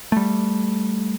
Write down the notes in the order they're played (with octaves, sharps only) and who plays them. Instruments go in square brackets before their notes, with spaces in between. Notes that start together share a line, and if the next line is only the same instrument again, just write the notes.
[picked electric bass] G3 A3